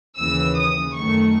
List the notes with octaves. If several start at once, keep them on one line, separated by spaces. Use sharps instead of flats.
D#2 C#3 E3 E6
D#6
F#2 D#3 A3 C#6